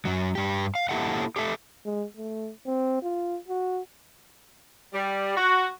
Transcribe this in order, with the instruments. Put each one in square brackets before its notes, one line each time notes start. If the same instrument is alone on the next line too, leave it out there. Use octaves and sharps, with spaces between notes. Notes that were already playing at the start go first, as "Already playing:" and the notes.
[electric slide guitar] F#2 F#3
G2 G4
F5
A#3 E4 G4 A4 E5 F#5
G4 A4 E5
[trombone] G#3
A3
C4
F4
F#4
[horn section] G3
F#4